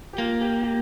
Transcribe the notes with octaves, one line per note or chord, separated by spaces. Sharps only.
G4
A#3 F4
G4
G4